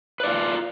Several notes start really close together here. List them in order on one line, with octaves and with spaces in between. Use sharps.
B4 D5 F4